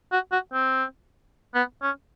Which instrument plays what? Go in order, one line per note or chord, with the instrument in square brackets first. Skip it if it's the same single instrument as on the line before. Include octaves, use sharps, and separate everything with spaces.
[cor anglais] F#4
F#4
C4
B3
C#4